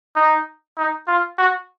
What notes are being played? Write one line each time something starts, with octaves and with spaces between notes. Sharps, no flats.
D#4
D#4
F4
F#4